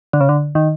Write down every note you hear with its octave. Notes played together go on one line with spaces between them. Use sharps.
D3
C#3
D3
D#3